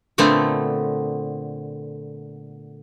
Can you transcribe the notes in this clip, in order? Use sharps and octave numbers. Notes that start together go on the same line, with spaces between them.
A#2 D3 A3 B3 C4